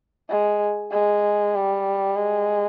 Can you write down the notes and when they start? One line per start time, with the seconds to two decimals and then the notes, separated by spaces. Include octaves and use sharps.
0.29 G#3
0.91 G#3
1.55 G3
2.16 G#3